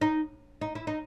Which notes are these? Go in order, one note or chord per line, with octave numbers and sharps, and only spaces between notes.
D#4
D#4
E4
D#4